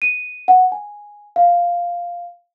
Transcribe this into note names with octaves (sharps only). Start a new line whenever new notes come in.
D#7
F#5
G#5
F5